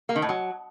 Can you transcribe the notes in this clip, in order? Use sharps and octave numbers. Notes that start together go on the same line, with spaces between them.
A#3
D#3
A2
F#3